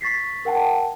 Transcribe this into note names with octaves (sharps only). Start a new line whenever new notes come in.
C#6 A6 B6 C7
A#4 F#5 G5 A5